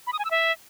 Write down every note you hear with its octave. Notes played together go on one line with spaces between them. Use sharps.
B5
D#6
G#5
E6
E5